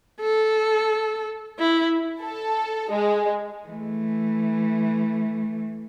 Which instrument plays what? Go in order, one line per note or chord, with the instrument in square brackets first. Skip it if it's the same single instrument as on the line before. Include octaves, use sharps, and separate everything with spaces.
[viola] A4
E4
[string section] A4
G#3
[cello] E3 A3